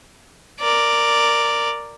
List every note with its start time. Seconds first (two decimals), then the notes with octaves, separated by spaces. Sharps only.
0.61 A#4 D5